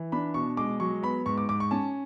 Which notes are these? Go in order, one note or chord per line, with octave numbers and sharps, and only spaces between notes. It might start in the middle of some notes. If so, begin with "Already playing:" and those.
Already playing: E3
D4 B5
B2 C#6
G#3 D6
F#3 C#6
B3 B5
G#2 C#6
D6
G#2 D6
C#6
C#4 A5